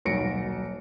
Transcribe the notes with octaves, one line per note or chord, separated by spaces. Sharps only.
D#1 B1 B2 A#6 C#7 D7